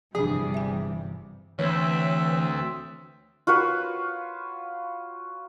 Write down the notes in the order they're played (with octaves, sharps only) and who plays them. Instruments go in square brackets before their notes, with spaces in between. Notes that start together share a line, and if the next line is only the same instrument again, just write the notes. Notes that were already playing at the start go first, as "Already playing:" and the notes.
[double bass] G1 C3 [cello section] E3 G3 [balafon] F3 D4 [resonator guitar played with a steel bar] G#4
[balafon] E5 G#5
[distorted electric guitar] D2 [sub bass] E3 [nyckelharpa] C4 E5 [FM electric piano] B4 C#5
[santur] F4 F#4 B4 C#5